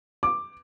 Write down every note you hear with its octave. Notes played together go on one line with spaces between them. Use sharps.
D6